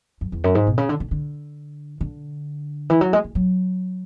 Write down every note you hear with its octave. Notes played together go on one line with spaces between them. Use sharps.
F#2
E2
F#2
G#2
B2
C#3
D3
D3
D3
D3
E3
F#3
G#3
G#3
F#3